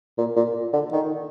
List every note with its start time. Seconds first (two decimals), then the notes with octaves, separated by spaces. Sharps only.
0.18 A#2
0.36 A#2
0.73 D3
0.92 D#3